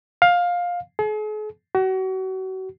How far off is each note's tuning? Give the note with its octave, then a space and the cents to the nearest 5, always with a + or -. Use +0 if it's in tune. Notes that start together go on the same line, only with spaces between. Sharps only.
F5 +15
G#4 +45
F#4 +35